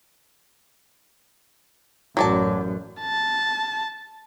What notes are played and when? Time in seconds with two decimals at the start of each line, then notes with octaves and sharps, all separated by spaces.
2.17 A1 F#2 F#3 D5 A5
3.01 A5